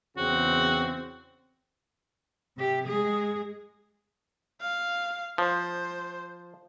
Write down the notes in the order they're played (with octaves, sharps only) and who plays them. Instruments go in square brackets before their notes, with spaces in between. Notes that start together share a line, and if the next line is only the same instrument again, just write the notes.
[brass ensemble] E2 C#3 C4 [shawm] F#4
[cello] C3 G4
G#3 G#4
[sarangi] F5
[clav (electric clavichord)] F3 [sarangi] C5